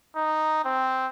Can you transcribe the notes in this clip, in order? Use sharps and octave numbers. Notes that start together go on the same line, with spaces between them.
D#4
C4